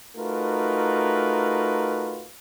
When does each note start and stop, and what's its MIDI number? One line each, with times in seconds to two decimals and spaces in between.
0.17 2.27 57
0.17 2.27 63
0.17 2.27 65
0.17 2.27 66
0.17 2.27 70
0.17 2.27 71